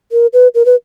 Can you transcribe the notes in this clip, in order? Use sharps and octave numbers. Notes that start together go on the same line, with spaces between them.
A#4
B4
A#4
B4